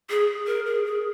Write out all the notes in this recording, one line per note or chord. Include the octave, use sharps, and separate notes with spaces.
G#4
A#4
G#4
G#4